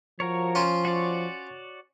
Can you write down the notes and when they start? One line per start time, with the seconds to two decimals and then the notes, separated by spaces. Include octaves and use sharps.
0.20 F3 F#4 A#4 C#5
0.55 C#4 F4 C5
0.85 F#4 C#5 D5